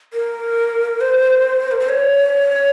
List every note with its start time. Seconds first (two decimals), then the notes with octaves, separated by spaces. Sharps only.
0.13 A#4
1.01 C5
1.72 A#4
1.80 C5
1.89 C#5